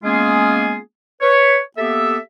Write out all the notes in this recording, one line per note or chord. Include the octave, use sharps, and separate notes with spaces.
G#3 A#3 B3 C#4 F4 G#4
B4 C#5
A#3 B3 G4 A4 E5